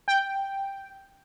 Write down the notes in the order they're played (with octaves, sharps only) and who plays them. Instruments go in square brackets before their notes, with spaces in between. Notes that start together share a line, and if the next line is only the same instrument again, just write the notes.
[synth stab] G5